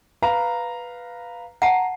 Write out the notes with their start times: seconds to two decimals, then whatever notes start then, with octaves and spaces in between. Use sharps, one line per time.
0.22 B4 F5 A#5
1.62 F#5 A5 A#5 C7